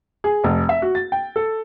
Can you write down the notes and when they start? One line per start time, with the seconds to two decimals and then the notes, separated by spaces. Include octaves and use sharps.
0.24 G#4
0.44 F1
0.69 E5
0.82 F#4
0.95 A6
1.12 G5
1.36 A4